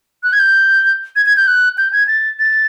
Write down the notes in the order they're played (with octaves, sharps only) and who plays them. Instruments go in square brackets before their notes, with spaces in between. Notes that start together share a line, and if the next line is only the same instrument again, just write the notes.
[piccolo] F#6
G#6
G6
G#6
G#6
G6
F#6
G6
G#6
A6
A6